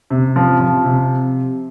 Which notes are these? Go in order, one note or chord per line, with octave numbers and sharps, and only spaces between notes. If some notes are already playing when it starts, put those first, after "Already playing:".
C3
F3
F3
C3